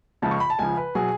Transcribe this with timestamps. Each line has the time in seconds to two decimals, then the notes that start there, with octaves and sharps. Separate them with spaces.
0.22 C#2 C#3 F3 A5
0.31 C#6
0.40 B5
0.50 A5
0.59 C#2 C#3 F3 G#5
0.77 B4
0.95 B2 F#3 G#4